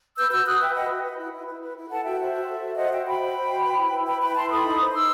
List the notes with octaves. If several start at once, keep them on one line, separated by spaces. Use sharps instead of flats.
B4 E6 G6
F#4 E6 G6
F#4 D#6 F#6
B4 E5 G5
B4 D#5 F#5
F#4
B4
E4
E4
B4
B4
E4
A4 F#5 A5
F#4 E5 G5
C5 E5
F#4
A4
F#4
C5 D#5 F#5
F#4 E5 G5
F#4 G5 B5
C5
C5
F#4
B4
E4
E4
B4 G5 B5
B4 G5 B5
E4 A5 C6
A4 B5 D#6
D#4
C5
D#4 C6 E6